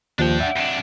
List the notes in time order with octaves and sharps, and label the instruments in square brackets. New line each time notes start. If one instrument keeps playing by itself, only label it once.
[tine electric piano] D#2 F3 [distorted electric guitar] D4 G5
[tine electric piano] E5 F#5
[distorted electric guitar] F2 D4